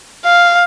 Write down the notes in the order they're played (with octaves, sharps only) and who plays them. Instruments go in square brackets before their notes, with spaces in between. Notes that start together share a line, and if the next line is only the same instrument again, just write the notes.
[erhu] F5